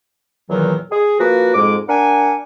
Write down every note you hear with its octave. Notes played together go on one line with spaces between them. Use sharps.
E2 A#2 D#3 E3 F#3
G#4
F3 A#3 F#4 B4
F2 G#2 G#3 D6
D4 A#4 F#5 G#5